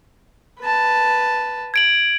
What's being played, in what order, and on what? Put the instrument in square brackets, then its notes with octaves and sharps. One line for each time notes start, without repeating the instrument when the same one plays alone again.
[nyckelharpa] B4 A5
[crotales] G#6 D7 F#7